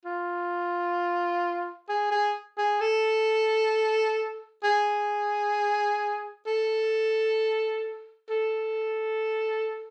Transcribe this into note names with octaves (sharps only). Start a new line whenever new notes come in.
F4
G#4
G#4
G#4
A4
G#4
A4
A4